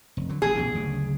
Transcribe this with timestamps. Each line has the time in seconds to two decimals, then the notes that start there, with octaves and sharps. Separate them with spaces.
0.17 F1
0.29 D3 F#3
0.42 A1 G#4
0.55 A1 B2 D3
0.75 F#1 D2 C#3